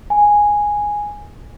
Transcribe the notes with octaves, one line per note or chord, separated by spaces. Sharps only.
G#5